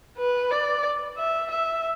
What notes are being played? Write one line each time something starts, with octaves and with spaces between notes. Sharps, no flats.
B4
D5
E5
E5